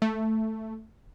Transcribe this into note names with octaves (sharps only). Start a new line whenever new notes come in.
A3